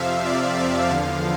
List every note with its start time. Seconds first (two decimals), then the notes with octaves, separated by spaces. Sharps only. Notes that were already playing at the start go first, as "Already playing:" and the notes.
Already playing: F2 C3 F3 E5 F5
0.26 D5
0.58 F5
0.90 E2 D3 F3 F5